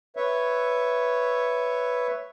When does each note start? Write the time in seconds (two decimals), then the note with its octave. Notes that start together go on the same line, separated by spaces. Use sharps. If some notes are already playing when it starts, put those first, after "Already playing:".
0.17 B4 C#5 E5